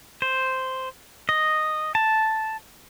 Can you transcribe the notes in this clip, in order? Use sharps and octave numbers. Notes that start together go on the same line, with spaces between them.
C5
D#5
A5